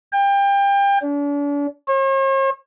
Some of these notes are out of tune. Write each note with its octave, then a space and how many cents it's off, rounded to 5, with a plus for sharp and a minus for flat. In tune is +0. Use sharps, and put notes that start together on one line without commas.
G5 +30
D4 -40
C#5 -45